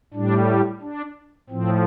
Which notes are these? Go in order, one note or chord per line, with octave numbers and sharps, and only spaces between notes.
A2 G3 D4
D4
A2 F3 C4